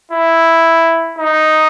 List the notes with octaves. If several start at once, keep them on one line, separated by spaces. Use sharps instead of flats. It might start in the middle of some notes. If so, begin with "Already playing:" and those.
E4
D#4